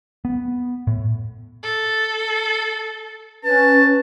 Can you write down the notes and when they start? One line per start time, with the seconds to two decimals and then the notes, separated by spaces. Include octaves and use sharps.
0.25 B3
0.87 A2
1.63 A4
3.44 C#4 B4 A5